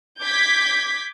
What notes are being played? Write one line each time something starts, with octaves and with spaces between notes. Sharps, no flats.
D6 G6 G#6 B6